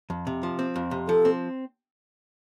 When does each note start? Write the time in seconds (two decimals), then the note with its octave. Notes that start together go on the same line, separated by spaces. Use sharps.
0.10 F2
0.27 C3
0.43 F3
0.59 C4
0.76 F2
0.91 C3
1.08 F3 A4
1.25 C4